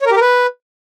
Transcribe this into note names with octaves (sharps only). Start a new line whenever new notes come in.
C#5
A#4
G4
A#4
B4